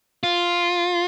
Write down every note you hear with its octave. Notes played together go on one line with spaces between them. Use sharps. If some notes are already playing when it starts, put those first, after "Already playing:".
F4